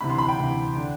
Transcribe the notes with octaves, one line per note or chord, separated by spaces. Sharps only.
D2 C3 E3 B5
C6
B5
G5
D2 C3 E3
D3